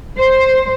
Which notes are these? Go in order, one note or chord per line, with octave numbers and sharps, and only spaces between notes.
C5